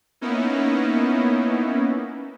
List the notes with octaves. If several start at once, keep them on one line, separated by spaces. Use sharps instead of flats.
A#3 B3 C#4 D#4 E4